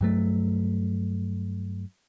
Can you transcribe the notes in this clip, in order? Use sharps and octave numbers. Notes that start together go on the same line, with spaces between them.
G2 F#3 A3